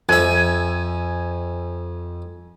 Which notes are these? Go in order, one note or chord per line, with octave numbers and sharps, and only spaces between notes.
F2 E5 G#5